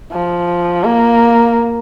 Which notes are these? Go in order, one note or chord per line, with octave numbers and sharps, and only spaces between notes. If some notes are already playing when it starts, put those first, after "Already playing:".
F3
A#3